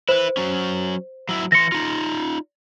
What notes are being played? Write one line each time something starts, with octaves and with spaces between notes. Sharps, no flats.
E4 B4 C5
F#3 C#4
F#3 E4
E3 C6 A#6 C#7
D#4 F4